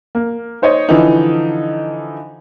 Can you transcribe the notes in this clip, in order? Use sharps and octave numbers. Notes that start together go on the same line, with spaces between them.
A#3
D#4 C5 C#5 D#5
D3 E3 F3 D#4